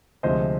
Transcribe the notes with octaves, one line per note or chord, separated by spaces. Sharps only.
D2 C3 F3 G#3 C5 D#5